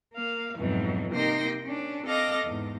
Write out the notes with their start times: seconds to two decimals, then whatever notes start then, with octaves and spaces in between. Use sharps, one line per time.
0.13 A#3 F5
0.58 F2 G#2 B2 E3 F#3
1.11 C3 A#3 D#4 G5 C6 A#6
1.64 C#4 D4
2.05 C4 A4 D#5 F5 D6 A#6
2.45 E2 G#2